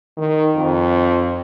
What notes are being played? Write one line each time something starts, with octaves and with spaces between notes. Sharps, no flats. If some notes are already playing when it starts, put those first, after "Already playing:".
D#3
F2